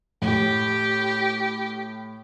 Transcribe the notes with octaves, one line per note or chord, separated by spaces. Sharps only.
A2 G4